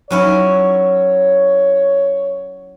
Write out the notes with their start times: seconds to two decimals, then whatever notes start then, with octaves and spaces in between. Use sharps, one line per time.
0.10 F#3 C#4 E4 C#5